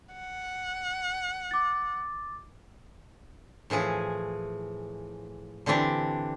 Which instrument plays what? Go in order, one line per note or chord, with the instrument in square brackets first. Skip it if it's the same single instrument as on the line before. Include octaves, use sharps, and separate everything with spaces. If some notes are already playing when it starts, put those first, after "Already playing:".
[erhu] F#5
[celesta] D6 A6
[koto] A2 E3 F3 G#4
D3 E3 C4 D4 G4